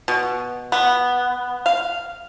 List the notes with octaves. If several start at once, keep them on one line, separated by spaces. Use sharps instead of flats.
B2
B3
F5